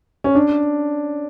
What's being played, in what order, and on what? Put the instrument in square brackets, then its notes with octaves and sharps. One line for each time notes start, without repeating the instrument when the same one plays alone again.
[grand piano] C#4
D4